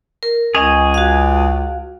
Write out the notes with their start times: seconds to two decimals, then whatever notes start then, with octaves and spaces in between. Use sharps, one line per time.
0.23 A#4
0.55 C#2 C#4 G#4 D#5 G#5
0.94 F#4 F5